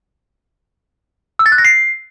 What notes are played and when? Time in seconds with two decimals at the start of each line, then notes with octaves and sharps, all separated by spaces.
1.39 E6
1.46 A6
1.52 F#6
1.58 A#6
1.65 C7